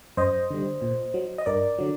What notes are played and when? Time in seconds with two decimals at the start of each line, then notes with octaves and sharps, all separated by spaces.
0.17 F#2 C5 D#5
0.51 D3 G3
0.82 A#2
1.14 F#3
1.38 D#5
1.46 G2 A#4 D5
1.79 D3 F#3